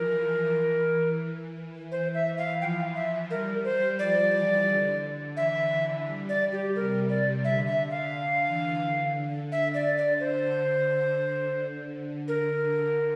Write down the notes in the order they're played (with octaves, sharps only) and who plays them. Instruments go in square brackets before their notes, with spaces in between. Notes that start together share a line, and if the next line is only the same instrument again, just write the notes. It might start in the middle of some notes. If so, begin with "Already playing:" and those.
Already playing: [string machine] E3 F3 [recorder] A#4
[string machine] E3
[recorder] C5
E5
F5
[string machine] F3 [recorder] G5
[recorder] F5
E5
[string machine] G3 [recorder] A#4
[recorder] C5
[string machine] F3 [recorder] D5
[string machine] E3
D3
[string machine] E3 [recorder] E5
[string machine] G3
[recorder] D5
G4
[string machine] C3 [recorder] A#4
[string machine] C3 [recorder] D5
[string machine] D3 [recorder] E5
[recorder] E5
F5
[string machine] D3
E3
D3
[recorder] E5
D5
D5
C5
[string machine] D3
D3
[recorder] A#4